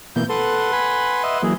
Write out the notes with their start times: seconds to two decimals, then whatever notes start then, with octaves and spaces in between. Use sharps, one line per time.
0.16 B2 E3 A#3 G6
0.29 A4 B4 F#5 C6
0.73 G#5 B5
1.24 D#5 E5
1.43 E3 F#3 A#3 G#4